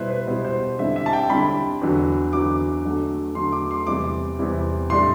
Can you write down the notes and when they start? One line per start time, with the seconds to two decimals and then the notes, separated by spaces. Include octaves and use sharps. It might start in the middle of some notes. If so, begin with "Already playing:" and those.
Already playing: B2 G3 B3 E4 B4 C5 E5
0.10 B4
0.27 B2 G3 B3 E4 C5
0.45 C5
0.79 D3 G3 C4 E4 E5
0.96 E5
1.06 A5
1.13 G5
1.30 D3 G3 C4 E4 B5
1.81 E2 D3 F#3
2.33 E2 D3 F#3 D6
2.85 D3 F#3 A3
3.35 D3 F#3 A3 C6
3.52 D6
3.71 C6
3.87 E2 C3 G3 C4 E4 D6
4.39 E2 C3 G3 C4 E4
4.90 A2 G3 D4 C6